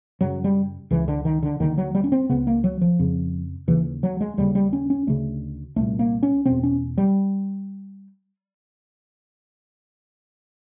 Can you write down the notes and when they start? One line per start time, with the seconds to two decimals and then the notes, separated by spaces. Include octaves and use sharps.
0.21 F#2 C#3 F#3
0.44 G3
0.91 C#2 C#3 E3
1.08 D3
1.25 D#3
1.43 D3
1.60 D#2 D3 D#3
1.78 F#3
1.95 G3
2.04 C#4
2.12 C4
2.29 C#2 C#3 B3
2.47 A#3
2.64 F#3
2.81 F3
2.99 F2 C#3
3.68 D#2 C#3 E3
4.03 F#3
4.21 G#3
4.37 D#2 C#3 G3
4.55 G3
4.73 C#4
4.90 C#4
5.07 D2 C#3 A3
5.76 C2 A#2 A3
5.99 A#3
6.23 C#4
6.46 E2 B2 C4
6.63 C#4
6.98 G3